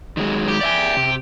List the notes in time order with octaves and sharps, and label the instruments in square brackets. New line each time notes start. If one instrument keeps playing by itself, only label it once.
[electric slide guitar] D#3 F#3 G#3
[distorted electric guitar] G4
[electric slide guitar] D5 E5 G#5
C3